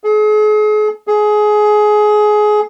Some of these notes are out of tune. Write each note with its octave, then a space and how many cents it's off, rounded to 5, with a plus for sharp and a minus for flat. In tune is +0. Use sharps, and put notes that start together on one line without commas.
G#4 +40
G#4 +20